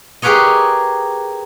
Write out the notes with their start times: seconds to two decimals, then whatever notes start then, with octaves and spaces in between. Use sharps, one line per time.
0.22 G4 G#4 A#4 B4 C#5 D#5